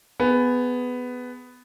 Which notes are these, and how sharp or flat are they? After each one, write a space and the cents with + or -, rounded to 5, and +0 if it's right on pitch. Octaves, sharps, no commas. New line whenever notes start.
B3 +10 G#4 +0